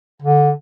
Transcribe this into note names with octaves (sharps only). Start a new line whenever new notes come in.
D3